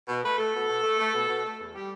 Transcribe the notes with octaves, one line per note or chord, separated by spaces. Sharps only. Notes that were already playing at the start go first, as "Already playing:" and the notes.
B2
A3 B4
A3 A4
B2
B2
A3
A3
B2
B2
A3
E2
G3 G4